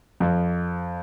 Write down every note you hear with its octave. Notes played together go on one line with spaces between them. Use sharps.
F2